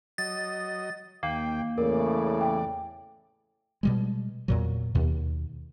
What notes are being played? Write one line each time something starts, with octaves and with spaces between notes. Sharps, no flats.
F#3 D#5 A6
D#2 A#3 G5
E2 A2 C#3 A#4 D5
G5
B2 G3 G#3
E2 A#2 F#3
D#2 B2